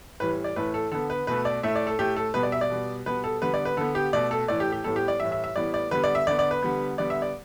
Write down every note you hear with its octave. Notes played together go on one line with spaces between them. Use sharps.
A2 E3 G3 B4
D5
A2 E3 A3 B4
A4
D3 B3 A4
B4
B2 A3 B4
D5
A2 A3 E5
D5
A4
A2 A3 G4
A4
B2 G3 B3 B4
D5
E5
D5
B2 G3 B3
B2 G3 B3 B4
A4
D3 G3 B3 B4
D5
B4
D3 B3 A4
G4
B2 A3 D5
A4
A2 E3 A3 D5
G4
G4
A2 G3 B3 A4
G4
D5
A2 E3 G3 E5
E5
E5
A2 E3 G3 B3 D5
D5
D3 G3 B3 B4
D5
E5
D3 B3 D5
D5
B4
D3 G3 B3
D3 G3 B3 D5
E5
D5